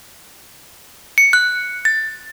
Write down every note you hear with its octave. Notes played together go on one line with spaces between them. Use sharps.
C#7
F#6
A6